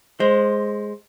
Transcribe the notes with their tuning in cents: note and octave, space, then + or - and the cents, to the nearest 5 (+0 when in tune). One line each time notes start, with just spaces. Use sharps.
G#3 +0 C5 +10